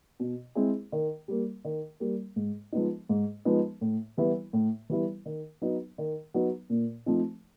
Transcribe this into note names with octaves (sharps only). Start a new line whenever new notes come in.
B2
G#3 C4 E4 G#4
D#3
G3 A#3
D#3
G3 A#3
G#2
F3 G#3 B3 D#4
G#2
F3 G#3 B3 D#4
A2
E3 G3 B3 E4
A2
E3 G3 B3 E4
D#3
F#3 B3 D#4
D#3
F#3 B3 D#4
A#2
F3 A3 C4 D#4